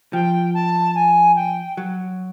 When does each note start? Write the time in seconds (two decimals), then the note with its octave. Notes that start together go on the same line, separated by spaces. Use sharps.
0.13 F3 G5
0.54 A5
0.95 G#5
1.36 G5
1.77 F#3